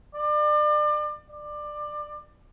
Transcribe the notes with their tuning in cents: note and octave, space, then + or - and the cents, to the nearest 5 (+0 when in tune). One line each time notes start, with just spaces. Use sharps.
D5 +35
D5 +20